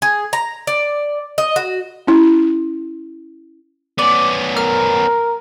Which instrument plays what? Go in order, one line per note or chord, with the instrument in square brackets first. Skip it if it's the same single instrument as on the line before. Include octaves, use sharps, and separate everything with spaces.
[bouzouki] G#4
A#5
D5
D#5
F#4
[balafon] C#4 E4
[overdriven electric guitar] B3 C#4 [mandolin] D5
[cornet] A#4 [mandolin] F6